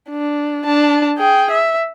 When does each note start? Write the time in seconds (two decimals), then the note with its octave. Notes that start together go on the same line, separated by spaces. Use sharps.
0.10 D4
0.65 D4 A5
1.18 G#4 G5
1.51 E5